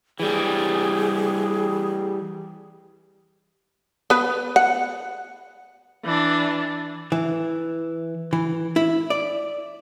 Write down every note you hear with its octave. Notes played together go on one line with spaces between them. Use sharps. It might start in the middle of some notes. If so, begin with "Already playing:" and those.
E3 G3 G#4
B3 B4
F#5
E3 D4
E3
E3
E4
D5